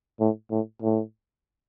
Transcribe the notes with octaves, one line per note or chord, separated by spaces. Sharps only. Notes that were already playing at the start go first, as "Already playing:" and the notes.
A2
A2
A2